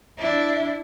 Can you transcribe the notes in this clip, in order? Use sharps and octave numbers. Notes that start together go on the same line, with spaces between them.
D4 E4